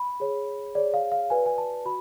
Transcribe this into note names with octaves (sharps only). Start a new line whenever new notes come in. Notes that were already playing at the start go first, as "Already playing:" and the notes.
Already playing: B5
G#4 C#5
G#4 C#5 D5
F5
F5
F#4 B4 D5 G#5
G#5
A5
F#4 B5